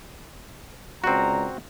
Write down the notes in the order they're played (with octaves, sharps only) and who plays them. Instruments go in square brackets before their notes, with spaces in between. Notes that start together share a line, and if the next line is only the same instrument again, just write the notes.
[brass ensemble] C#2 D5 A#5 [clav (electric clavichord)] C4 F#4